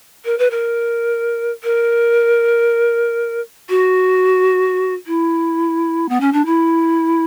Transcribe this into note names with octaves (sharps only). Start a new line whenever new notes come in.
A#4
B4
A#4
A#4
F#4
E4
B3
C#4
D4
E4